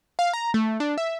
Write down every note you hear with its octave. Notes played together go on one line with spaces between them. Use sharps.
F5
A#5
A3
D4
E5